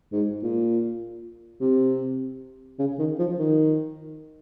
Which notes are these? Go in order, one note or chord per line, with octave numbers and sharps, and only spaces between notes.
G#2
A#2
C3
C#3
D#3
F3
D#3